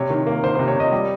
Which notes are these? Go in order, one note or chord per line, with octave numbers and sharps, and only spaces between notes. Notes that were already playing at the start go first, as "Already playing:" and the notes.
Already playing: C3 C#5
D#3
A#3
D#3 C5
C3 C5
C#5
C3 D#5
G3